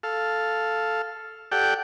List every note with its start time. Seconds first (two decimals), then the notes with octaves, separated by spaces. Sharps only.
0.03 A4 F5
1.52 G4 A4 D5 F#5 G5